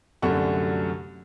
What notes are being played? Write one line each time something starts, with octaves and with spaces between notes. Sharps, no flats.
C2 F#2 D3 A3 F#4 C#6